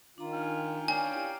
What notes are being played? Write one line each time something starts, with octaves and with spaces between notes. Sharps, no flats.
D#3 D4 F4 A#5
G5 G#5 F6
C#4 A#4 D5 F5 G5 G#5
E4 G4